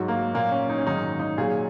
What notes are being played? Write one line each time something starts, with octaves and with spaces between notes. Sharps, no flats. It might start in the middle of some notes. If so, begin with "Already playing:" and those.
Already playing: G#2 F#3 F#4
A#3
A#2 F#3 A#3
C#4
D#4
C#4
G#2 D#3 F#3 D#4
D#4
A#2 F#3 G#4